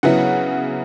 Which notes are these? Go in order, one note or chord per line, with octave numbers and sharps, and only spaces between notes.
C#3 F#3 B3 E4 F#5